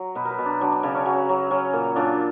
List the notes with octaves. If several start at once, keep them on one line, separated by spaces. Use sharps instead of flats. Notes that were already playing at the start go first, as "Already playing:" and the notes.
Already playing: F#3
B2 B4
A#4
B4
B2
D4
F#3 D4
D4
C#3 D4
C#4
F#3
F#3
F#3 C#4
A#2
A#2 D4